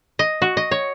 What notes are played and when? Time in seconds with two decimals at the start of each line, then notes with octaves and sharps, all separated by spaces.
0.19 D#5
0.42 F#4
0.57 D#5
0.71 C#5